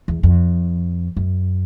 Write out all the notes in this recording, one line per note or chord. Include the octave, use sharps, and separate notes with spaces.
E2
F2
F#2